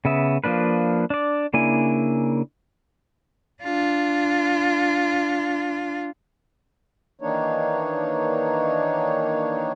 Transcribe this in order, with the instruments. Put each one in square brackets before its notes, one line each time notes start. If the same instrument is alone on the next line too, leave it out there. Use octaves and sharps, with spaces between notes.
[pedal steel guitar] C#3 B3 E5
F3 A#3 D4 B4
D4 D5
C#3 A#3 D4 E4 G#5
[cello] D4 F4
[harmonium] D#3 E3 A#3 D4 D#4 C#5